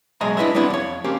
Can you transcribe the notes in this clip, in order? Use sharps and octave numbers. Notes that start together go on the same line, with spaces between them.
B2 F#3 G#3 D#5 E5 A#5
D4 E4 B4 D#5 E5
G3 B3 C4 D4 E4
F2 C#5
A#3 C4 C#4 G4